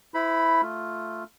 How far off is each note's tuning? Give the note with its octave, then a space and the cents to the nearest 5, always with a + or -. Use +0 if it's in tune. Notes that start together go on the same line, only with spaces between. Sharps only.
E4 +0 C5 -40 B5 +0
A3 +0 F4 +0